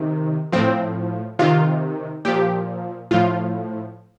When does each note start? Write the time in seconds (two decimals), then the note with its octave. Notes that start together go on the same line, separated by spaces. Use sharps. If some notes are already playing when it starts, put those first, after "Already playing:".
Already playing: C3 D#3
0.52 A2 F3 C4
1.39 C3 D#3 F4
2.25 A#2 F3 G4
3.11 A2 F3 F4